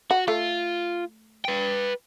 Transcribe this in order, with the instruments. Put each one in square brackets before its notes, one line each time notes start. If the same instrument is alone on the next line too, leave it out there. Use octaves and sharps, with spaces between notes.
[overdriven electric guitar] F#4 [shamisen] F#5
[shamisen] A3 [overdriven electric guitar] F4
[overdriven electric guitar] B4 G5